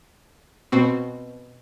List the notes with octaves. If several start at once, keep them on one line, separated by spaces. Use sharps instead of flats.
B2 C4 F#4